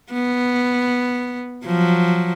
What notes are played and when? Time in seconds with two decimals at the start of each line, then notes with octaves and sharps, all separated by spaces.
0.12 B3
1.65 F3 F#3